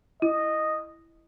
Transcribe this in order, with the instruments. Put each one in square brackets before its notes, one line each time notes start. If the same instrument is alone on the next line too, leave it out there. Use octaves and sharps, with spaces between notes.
[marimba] E4 [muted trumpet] D#5